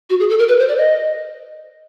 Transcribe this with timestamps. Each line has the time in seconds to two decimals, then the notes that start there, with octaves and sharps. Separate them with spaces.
0.10 F#4
0.20 G#4
0.30 A4
0.39 A#4
0.49 B4
0.59 C5
0.68 D5
0.78 D#5